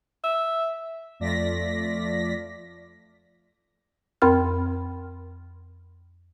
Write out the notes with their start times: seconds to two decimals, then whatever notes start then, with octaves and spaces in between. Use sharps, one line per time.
0.24 E5
1.20 F2 A3 F4 D5 A#6 B6
4.22 F2 C4 A#4 B5 C6 F6